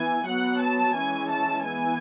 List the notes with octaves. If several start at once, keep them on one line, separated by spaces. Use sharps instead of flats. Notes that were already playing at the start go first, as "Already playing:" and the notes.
Already playing: E3 B3 G#5
F#3 B3 F#5
A5
E3 G#3 C#4 G#5
A5
E3 B3 G#5